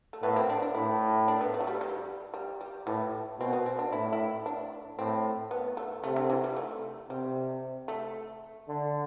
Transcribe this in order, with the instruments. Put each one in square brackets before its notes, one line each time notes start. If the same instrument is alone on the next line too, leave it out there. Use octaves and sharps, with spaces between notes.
[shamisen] A3
[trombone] A2 [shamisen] B3
[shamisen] C4
D4
D4
[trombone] A2 [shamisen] E4
[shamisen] D4
B3
A3
F#3
G3
G3
G3
G3
[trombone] A2 [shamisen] E3
[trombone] B2 [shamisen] C4
[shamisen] B3
C4
D4
[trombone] A2 [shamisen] E4
[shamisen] E4
D4
[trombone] A2 [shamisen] C4
[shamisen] B3
A3
[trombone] C3 [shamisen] A3
[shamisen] D3
E3
G3
A3
[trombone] C3 [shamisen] G3
[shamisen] A3
[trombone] D3